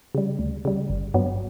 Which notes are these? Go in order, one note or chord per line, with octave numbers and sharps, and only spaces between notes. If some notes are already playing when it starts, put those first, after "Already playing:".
C#3 G3
D2
C#3 G3
G1
G2 F#3 B3